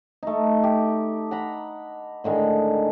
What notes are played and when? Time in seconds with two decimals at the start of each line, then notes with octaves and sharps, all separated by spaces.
0.23 A3 D#4
0.63 G4
1.31 F#5 A#5 B5
2.24 A2 D3 D#3 G#3